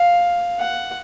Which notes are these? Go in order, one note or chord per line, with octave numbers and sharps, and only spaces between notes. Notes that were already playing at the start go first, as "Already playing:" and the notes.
Already playing: F5
F#5